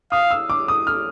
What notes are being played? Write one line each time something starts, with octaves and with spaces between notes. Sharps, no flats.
F5 D#6
E6
D6
D#6
F6